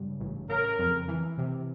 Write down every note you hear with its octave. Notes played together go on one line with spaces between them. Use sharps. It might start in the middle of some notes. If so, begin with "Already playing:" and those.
Already playing: G2 C#3
A1
C#3 A#4
F2
E3
C3